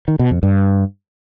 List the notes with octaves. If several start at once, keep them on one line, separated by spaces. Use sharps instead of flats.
D#3
B2
F2
G2